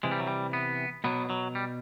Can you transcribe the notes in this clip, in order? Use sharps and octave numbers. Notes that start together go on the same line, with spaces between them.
C3 E3 G#3
G3
F#3
G3
B3
B2 F#3 B3
F#3
G3